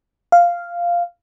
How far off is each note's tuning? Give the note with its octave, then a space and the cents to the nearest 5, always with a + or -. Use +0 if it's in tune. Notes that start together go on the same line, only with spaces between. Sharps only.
F5 -5